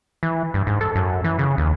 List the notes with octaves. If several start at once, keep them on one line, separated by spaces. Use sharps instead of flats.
E3
G2
G#2
A4
F#2
E3
C#3
D#2